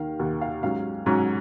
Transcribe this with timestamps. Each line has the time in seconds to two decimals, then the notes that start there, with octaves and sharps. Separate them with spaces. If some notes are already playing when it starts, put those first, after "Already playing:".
Already playing: D#2 D#3 A#3 F5
0.19 D#2 D#3 A#3 F#5
0.41 F5
0.63 G#2 F#3 C#4 F5
1.06 G#2 F#3 C#4